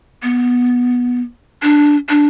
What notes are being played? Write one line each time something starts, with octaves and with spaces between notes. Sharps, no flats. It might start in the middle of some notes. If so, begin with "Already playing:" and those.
B3
D4
D4